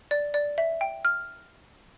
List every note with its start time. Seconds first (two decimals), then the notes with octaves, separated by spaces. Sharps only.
0.11 D5
0.34 D5
0.58 E5
0.81 G5
1.05 F6